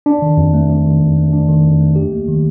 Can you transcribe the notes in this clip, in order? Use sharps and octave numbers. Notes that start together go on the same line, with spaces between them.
D4
D#3
F2
A3
D4
D#3
F2
A3
D4
D#3
F2
A3
G4
A#3
D#3